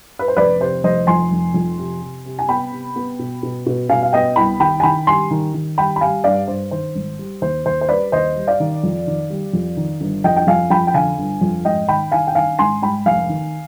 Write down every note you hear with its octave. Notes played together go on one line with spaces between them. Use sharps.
B4
C5
F1 B4 D5
C3 C5
F1 C5 D#5
F2 G#5 C6
F1
F2
C3
C3
C3
G#5
B3 G5 B5
C3
B3
B2
B2
B2
B2 F5 G#5
F5
B3 D#5 G5
C2 G5 B5
D#3 G5 B5
G#5
D#3 G5 B5
G3 G#5 C6
D#3
D#3
G3 G5 B5
B5
G3 F5 G#5
G2 D5 F5
G2 C5
D#3 C5
G#1
G3
D#2 C5
D#2 C5
C5
G3 B4 D5
D#2 C5 D#5
G3
D5 F5
D#3
F2
D#3
G3
F2
D#3
G1
F2 D#5 G5
G5
F2 F5 G#5
F2 G5 B5
G5
D3 F5 G#5
G1
F2
G#2 D#5 G5
D#3 G5 B5
D#3 F5 G#5
G5
D#3 F5 G#5
G#2 G#5 C6
G#2 G5 B5
F1 F5 G#5
D#3